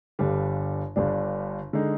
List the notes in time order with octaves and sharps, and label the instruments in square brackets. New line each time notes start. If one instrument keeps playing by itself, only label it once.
[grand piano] G1 G2 D3 G3 D4
G1 G2 D3 G3 D4
D3 G#3 D#4